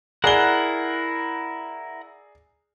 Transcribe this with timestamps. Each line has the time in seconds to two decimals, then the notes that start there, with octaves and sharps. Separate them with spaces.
0.24 E4 G#4 A#4 D5 F#5 G7